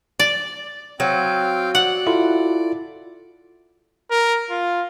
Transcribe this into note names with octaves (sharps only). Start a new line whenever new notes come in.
D5
F#3 C4 F5 G5
D5 F#5
E4 F4 A4
A#4
F4